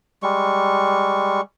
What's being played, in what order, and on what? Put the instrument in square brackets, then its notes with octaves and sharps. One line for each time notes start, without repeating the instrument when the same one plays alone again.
[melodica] G3 G#3 C#6